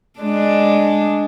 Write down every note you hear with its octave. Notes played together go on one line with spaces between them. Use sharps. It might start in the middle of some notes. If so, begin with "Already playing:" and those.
G#3 D4